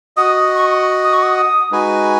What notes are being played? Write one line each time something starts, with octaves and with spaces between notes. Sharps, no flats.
F#4 D#5 F#5 D#6
C#6
D#6
C#6
D#6
G#3 D#4 F#4 B4 G#5